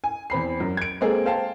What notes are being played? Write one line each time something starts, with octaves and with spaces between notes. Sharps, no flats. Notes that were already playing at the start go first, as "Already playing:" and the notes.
G#5
E2 C4 B5 C7
F#2
G#6 D7
G#3 A#3 C4 G#4 A4
C5 F5 G5 A5